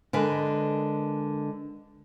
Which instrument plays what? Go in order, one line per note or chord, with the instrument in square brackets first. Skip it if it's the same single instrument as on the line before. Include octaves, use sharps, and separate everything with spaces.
[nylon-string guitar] D3 G#3 A#4 B4 D#5 G#5